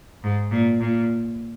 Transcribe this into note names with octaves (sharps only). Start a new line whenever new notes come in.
G#2
A#2
A#2